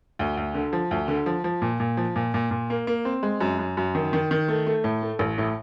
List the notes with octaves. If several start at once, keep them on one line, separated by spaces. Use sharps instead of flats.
D2
D2
D3
F3
D2
D3
F3
F3
A#2
A#2
F3
A#2
A#2
A#2
A#3
A#3
C4
G#3
F#2
F#2
F#2
D#3
D#3
D#3
A3
A3
A2
A3
A1
A2